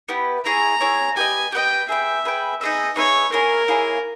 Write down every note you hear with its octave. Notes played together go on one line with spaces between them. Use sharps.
B3 E4 G4 B4
E4 G#4 C#5 A#5
E4 G#4 C#5
G4 B4 D#5 G#5
G4 B4 D#5 G5
G#4 B4 E5 G5
G#4 B4 G5
D#4 G#4 B4 D#5 E5
D#4 G#4 B4 C#5 E5
A#3 E4 G#4 A#4 C#5
A#3 E4 G#4 C#5